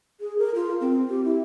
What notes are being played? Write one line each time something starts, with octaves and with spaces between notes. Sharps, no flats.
G#4
A#4
F4
C4
G4
E4